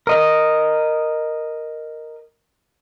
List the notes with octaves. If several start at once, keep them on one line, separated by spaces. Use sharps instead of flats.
A#4 D#5